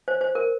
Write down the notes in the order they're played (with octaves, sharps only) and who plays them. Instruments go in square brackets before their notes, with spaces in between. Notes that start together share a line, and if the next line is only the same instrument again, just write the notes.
[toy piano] C5
C5
A#4